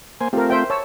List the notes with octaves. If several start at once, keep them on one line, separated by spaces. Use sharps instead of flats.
A#3 C5 G#5
A3 C4 F4 G4 A#4
C5 E5 G5
C#5 A5 E6